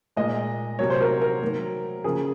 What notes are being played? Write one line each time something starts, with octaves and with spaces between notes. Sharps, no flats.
A#2 G#3 D#5
C3 F#3 A#3 C#5
C5
A#4
A#4
D#3 F#3 A#3
C#3 F3 A#3 G#4